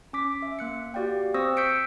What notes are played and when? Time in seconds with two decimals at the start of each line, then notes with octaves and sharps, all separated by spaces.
0.13 C#4 D6 B6
0.42 E5
0.59 A#3 F#6 C#7
0.94 F#4 G4 D5 F5 G5
1.34 C4 C5 C#6 D#6 E6 A#6
1.57 E6 G6 B6 C#7 D7